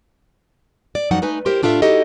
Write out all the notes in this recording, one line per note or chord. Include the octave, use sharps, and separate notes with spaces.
D5
F#2 F3 F#3 D#4 F#5
A3 D#4 B4 G#5
E4 G4 A#4 C5
A2 D4 F4 A4 E5
D#4 E4 F#4 G4 A4 D#5